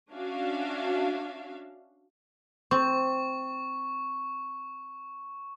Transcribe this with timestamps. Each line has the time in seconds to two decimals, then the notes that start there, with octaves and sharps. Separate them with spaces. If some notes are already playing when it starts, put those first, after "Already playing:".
0.11 C#4 D4 F#4 E5 F5
2.71 C4 C#6